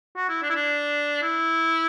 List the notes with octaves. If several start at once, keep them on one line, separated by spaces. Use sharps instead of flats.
F#4
E4
D4
E4
D4
E4